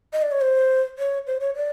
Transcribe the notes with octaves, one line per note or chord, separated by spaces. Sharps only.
D#5
D5
C#5
C5
C#5
C5
C#5
D5